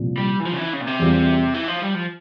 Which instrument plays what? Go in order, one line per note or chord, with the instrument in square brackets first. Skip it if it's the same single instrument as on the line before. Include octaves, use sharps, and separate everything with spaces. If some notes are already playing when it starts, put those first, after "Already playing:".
Already playing: [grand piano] C2 A#2 F3
[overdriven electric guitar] G3
E3
F3
C#3
E3
C#3
A#2
C3
[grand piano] E2 E3 G3 C4 F4
[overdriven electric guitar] E3
F3
G3
F3